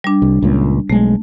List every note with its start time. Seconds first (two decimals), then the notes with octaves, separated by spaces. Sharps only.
0.04 G3 D4
0.22 C2
0.42 C#2 A#2
0.90 B1 G#3 A3